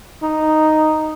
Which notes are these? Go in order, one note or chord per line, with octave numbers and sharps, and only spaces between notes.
D#4